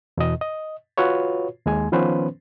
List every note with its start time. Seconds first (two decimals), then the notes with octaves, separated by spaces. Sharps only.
0.17 E2 B2 D#5
0.41 D#5
0.98 F4 F#4 B4 C#5
1.66 D#2 G#3 G#5
1.92 D#3 F3 B3 C#4 B4 C5